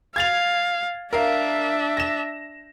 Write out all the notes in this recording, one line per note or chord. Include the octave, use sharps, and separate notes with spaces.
F5 G#6 A6 F7
D4 A#4 E5 F5
A#6 E7